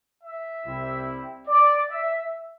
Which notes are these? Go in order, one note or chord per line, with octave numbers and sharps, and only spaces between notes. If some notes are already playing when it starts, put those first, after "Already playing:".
E5
C2 C3 G3 C4 E4
D5
E5